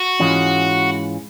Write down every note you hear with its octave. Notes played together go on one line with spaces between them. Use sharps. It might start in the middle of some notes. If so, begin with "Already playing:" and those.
Already playing: F#4
G#2 E3 G#3 C#4 F4